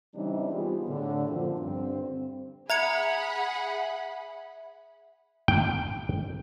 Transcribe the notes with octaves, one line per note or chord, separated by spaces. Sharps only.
C#3 E3 G3 C4 D4 D#4
G3 B3 C4 F4 G4 G#4
A2 D3
F#2 A#2 F3 C4
G2 D3 C4
G#4 E5 F#5 A#5 B5 G#6 C#7
G5